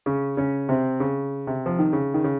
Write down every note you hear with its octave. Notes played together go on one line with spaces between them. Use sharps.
C#3 C#4
C#3 C#4
C3 C4
C#3
C3
F3
D#3
C#3
D#3
C#3